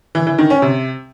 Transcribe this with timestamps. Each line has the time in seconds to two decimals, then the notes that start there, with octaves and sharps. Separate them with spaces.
0.15 E3
0.27 E3
0.38 D#3
0.50 C#4
0.62 C3